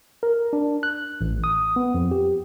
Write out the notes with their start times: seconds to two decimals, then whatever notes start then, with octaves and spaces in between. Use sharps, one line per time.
0.23 A#4
0.53 D4
0.83 F#6
1.21 A1
1.44 D#6
1.76 B3
1.94 F2
2.11 G4